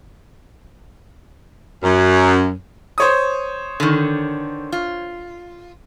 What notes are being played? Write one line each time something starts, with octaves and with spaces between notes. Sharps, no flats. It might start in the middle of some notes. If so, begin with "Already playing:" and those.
F#2
C5 C#5 D#6
D3 D#3
F4